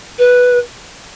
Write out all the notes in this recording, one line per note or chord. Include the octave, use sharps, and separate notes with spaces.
B4